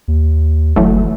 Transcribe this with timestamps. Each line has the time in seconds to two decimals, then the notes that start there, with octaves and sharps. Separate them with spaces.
0.08 D#2
0.76 F#1 E3 F#3 A3